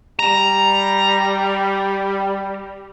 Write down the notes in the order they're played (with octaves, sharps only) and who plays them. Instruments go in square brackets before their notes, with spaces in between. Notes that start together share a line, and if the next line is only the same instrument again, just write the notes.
[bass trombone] G3 [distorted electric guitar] A#5